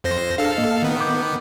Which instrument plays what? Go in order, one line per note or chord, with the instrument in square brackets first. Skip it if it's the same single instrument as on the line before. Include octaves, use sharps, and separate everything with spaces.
[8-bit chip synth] F2 C5 A#6
[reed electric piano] D4 G#4 [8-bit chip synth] A4 F5
[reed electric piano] A2 A#3 D#5
[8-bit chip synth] D#3 B3
[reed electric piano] D6 G6